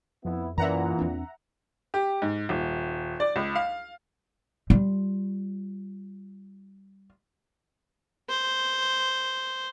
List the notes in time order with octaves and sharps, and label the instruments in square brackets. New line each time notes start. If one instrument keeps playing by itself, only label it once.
[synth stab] F2 [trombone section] B3 E4
[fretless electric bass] F#2 C#4 [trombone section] A#2 [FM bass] E3 [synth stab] E5 F#5 A#5
[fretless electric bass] E2 C4 D4
[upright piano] G4
G#2
D#1
D5
C#2
F5
[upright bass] G3 F4
[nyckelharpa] C5